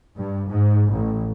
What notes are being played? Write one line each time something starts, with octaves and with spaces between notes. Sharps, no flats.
G2
G#2
A1